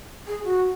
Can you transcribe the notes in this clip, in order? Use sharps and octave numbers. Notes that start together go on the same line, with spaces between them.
G#4
F#4